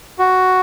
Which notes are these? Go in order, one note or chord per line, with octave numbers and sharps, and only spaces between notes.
F#4